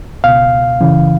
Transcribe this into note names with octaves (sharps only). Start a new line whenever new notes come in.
C#2 B2 F5
F#2 C#3 E3